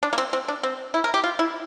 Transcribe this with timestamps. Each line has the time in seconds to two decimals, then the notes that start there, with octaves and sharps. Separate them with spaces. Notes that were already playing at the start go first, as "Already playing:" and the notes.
0.03 D4
0.13 A#3
0.18 C4
0.33 C4
0.48 D4
0.63 C4
0.94 E4
1.04 A#4
1.14 G4
1.24 F4
1.39 E4